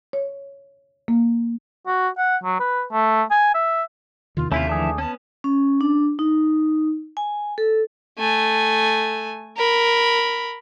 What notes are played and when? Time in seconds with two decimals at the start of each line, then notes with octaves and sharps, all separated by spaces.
0.13 C#5
1.08 A#3
1.87 F#4
2.18 F#5
2.43 F#3
2.60 B4
2.92 A3
3.31 G#5
3.54 E5
4.37 E2 C3 D#3 F4
4.52 D#2 C3 A3 C#4 E4 F4 E5
4.67 D3 E3 F3 A3 D4 G#4
4.98 B3 C#4 A5
5.44 C#4
5.81 D4
6.19 D#4
7.17 G#5
7.58 A4
8.19 A3 G#5
9.57 A#4 B5